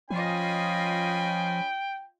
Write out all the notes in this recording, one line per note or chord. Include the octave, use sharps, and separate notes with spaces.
F3 C#4 F4 D#5 G5 G#5 B5